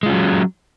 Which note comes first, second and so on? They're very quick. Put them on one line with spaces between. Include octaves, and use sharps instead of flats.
G#3 F4 C#4 F#3